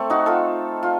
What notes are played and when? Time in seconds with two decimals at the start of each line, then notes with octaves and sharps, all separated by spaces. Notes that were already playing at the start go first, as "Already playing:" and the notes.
Already playing: A3 C4
0.10 D#4 F#4
0.26 F4 A4
0.83 F4